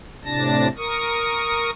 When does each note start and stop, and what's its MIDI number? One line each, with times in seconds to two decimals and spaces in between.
0.24 0.68 45
0.24 0.68 48
0.24 0.68 62
0.24 0.68 81
0.24 0.68 94
0.77 1.70 70
0.77 1.70 85
0.77 1.70 87